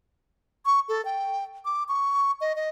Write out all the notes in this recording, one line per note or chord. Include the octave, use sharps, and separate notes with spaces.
C#6
A4
G5
D6
C#6
D#5
D#5